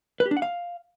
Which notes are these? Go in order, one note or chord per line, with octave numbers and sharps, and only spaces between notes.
B4
G4
D4
F#5
F5